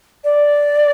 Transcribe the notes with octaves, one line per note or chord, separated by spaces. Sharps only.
D5